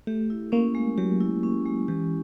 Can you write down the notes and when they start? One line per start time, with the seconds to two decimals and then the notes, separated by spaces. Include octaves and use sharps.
0.07 A3 G4
0.30 E4
0.52 A#3 C#4
0.75 G#3
0.98 F#3 G4
1.21 E4
1.43 C#4
1.66 G#3
1.88 E3 G4